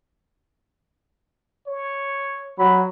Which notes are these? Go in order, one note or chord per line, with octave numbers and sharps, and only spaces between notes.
C#5
F#3 B5